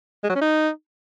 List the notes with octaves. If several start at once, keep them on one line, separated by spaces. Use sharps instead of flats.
G#3
F#3
C#4
D#4